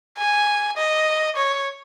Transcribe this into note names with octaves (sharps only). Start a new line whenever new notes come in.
G#5
D#5
C#5